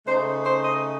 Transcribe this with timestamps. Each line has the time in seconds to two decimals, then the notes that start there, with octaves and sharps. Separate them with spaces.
0.07 C#3 A3 D#4 C5
0.45 C5
0.64 D#5